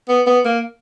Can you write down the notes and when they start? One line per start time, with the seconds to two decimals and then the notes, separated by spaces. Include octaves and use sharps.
0.09 B3
0.27 B3
0.45 A#3